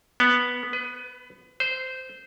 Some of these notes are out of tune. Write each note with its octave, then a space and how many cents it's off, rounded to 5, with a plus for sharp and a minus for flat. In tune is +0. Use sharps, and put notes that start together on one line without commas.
B3 -5
B4 +30
C5 -15